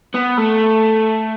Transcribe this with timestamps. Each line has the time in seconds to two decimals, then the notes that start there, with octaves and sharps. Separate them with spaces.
0.15 B3
0.38 A3